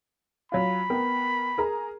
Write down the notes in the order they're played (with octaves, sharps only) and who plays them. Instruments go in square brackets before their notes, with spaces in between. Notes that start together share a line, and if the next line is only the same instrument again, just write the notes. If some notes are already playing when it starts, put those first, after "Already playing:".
[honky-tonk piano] F#3 F4 [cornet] B5
[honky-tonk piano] B3 A#4 G5
G#4 A#4 A#5